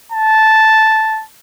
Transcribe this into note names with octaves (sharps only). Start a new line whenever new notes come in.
A5